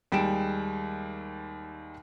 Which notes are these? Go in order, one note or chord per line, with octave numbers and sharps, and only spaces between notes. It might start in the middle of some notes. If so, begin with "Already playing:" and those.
D#2 G3 G#3 G5 D7 E7